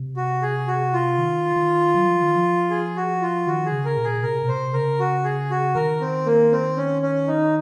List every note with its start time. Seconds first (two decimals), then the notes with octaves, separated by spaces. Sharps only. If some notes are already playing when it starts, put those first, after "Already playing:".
Already playing: C3
0.17 F#4
0.42 G#4
0.67 F#4
0.93 F4
1.18 D#3
1.56 D#3
1.94 F#3
2.08 F3
2.22 D#3
2.36 F3
2.70 G#4
2.96 F#4
3.22 F4
3.47 D#3 F#4
3.66 G#4
3.72 C#3
3.85 A#4
3.97 A#2
4.04 G#4
4.23 C3 A#4
4.42 A#2
4.48 C3 C5
4.73 C#3 A#4
4.99 F#4
5.24 G#4
5.50 F#4
5.75 D#3 A#4
6.01 C4
6.26 A#3
6.52 C4
6.77 C#4
7.02 C#4
7.28 D#4